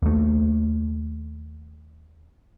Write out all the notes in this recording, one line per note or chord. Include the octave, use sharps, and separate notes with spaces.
D#2 A3